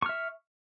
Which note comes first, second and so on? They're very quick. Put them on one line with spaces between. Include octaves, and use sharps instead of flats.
C#6 F6 E5